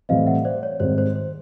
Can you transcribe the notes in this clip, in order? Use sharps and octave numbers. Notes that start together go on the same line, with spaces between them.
A2 E3 G3 C4 D#5 F5
E5 F#5
C5 D5
C#5
G#2 D#3 G3 C4 C5
C5
C5